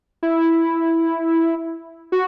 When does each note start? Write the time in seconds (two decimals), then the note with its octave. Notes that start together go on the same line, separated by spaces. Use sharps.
0.23 E4
2.12 F#4